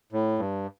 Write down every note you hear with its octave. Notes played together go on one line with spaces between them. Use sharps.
A2
G2